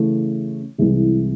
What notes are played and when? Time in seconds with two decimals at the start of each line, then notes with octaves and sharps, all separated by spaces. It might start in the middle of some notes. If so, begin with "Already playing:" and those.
Already playing: C#3 E3 A3
0.78 C2 C3 E3 G#3